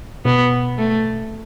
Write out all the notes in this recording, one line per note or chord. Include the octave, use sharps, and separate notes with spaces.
B2 B3
A3